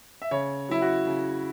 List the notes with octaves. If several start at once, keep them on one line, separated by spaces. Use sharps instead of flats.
E5
C#3 C#5
F#3 E4
F#4
C#3